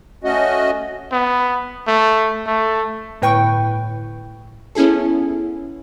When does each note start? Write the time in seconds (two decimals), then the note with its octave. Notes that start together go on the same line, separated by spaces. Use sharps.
0.24 A3 C#4 F#4 D#5
1.12 B3
1.87 A3
2.46 A3
3.22 G1 A2 B4 G5 C#6
4.75 B3 C#4 E4 G#4 A4